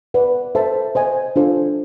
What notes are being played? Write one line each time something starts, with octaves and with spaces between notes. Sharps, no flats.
B4 D5 F#5
A4 C5 E5 A5
C5 D#5 G#5
D4 F4 A4 C5